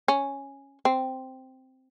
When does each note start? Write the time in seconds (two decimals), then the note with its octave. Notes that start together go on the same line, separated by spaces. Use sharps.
0.08 C#4
0.85 C4